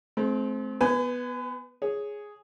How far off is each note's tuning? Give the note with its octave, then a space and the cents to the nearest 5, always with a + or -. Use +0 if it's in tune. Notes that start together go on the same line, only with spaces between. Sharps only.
A3 -45 C4 +0
B3 +0 B4 +40 G#5 +0
G#4 +0 C#5 +0